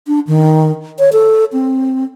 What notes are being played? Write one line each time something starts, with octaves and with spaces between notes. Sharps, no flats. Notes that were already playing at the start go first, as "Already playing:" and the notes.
D4
D#3
C#5
A4
C4